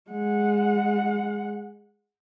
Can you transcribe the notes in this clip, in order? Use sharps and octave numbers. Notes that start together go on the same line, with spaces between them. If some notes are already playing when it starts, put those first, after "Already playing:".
G#3 F#5